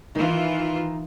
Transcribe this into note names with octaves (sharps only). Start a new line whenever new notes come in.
D#3 E3 D#4 F4